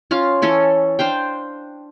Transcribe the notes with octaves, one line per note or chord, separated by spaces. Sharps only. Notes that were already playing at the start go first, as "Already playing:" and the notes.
C#4 F4 F5
E3 C#4 A4 C#5
D4 C5 F5 G5